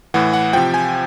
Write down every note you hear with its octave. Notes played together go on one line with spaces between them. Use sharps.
A2 E3 F#5
F#5
C3 F3 G5
G#5